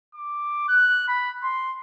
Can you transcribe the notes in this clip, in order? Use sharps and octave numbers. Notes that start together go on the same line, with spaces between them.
D6
F#6
B5
C6